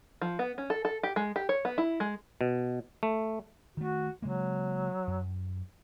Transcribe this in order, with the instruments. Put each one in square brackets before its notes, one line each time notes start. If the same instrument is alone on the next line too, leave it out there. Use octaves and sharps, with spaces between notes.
[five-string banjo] F3
B3
C#4
A4
A4
G4
G#3
G4
C#5
B3
E4
G#3
[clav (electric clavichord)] B2
A3
[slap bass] D#3 A3 [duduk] F#4
[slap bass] C#3 G#3 A#3 [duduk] F#3
[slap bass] F#2